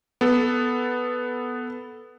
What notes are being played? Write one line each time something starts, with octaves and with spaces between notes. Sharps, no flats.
B3 A4